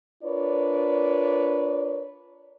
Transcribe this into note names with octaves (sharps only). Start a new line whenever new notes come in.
D4 F4 A#4 B4 C#5 D5